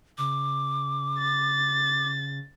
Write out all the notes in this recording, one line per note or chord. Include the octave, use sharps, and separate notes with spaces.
C#3 D6
A6